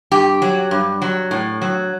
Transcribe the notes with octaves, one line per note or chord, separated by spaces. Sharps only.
G2 G4
F#3
G2
F#3
A2
F#3